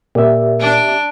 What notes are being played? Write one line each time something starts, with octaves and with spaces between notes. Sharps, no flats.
A#2 G4 D5 E5
D4